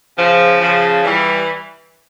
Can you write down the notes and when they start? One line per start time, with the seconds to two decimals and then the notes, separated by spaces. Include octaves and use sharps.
0.17 C#3 F3
0.61 C#3 F3
1.04 E3 G3